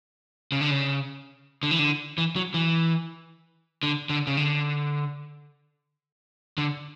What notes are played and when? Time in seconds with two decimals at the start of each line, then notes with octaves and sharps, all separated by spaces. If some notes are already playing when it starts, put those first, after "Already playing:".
0.52 C#3
0.61 D3
0.70 C#3
1.63 D3
1.71 E3
1.79 D3
2.18 E3
2.36 F#3
2.54 E3
3.83 D3
4.09 D3
4.27 C#3
4.37 D3
6.58 D3